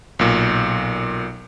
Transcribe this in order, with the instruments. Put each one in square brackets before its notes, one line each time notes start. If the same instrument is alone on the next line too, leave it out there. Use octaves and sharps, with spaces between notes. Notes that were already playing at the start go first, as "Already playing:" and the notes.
[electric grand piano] B1 A#2